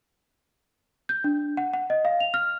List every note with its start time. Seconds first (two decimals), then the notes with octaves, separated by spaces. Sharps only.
1.09 G6
1.24 D4
1.57 F#5
1.74 F#5
1.90 D#5
2.05 F5
2.20 F7
2.34 F6